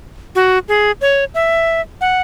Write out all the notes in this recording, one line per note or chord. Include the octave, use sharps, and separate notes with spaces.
F#4
G#4
C#5
E5
F#5